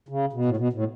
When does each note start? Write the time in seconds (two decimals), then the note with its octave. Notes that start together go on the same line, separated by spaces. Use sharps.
0.09 C#3
0.33 B2
0.45 A2
0.57 B2
0.73 A2